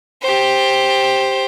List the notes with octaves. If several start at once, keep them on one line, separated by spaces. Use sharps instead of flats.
G4 C5